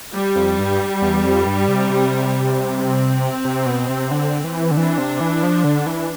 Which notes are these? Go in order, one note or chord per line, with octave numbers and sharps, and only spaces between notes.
G3
F2
G2
E2
F2
G2
C3
C3
C4
C3
B2
C3
D3
E3
D3
E3 D4
C3
E3
F3
D3
E3